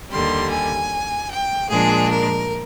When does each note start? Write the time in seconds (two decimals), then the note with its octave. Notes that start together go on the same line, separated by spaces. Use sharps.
0.11 D#2 D3 G3 C6
0.50 G#5
1.30 G5
1.69 A#2 F3 G#3 D4 G#4
2.09 A#4